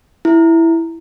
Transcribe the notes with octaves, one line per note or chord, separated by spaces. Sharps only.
E4